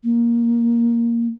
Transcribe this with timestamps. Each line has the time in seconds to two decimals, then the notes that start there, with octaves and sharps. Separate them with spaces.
0.04 A#3